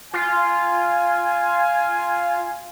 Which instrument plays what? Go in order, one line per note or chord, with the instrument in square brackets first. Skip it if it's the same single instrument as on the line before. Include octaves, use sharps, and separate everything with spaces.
[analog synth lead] F4 [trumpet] G#5